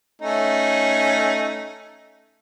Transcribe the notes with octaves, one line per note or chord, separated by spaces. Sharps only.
A3 C#4 D#4